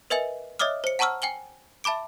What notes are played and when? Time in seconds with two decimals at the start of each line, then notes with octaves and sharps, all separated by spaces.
0.10 A#4 B4 D#5 E5 G#5 F#7
0.59 C#5 D#5 E5 D6 D#6 F6
0.84 C5 C#7
0.99 F#5 A5 A#5 C#6 E6 F6
1.22 G5 G#5 F#7 G7
1.84 E5 A5 B5 D6 D7